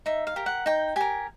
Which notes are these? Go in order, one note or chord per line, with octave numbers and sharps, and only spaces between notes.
D#4 E5
F5
G4 A#4
F#5
D#4 G5
G4 A#4 G#5